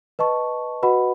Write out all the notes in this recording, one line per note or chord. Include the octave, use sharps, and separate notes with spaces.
B4 D#5 A5 C#6
F#4 B4 D#5 F#5 B5